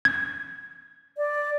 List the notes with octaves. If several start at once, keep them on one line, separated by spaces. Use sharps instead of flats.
G#6
D5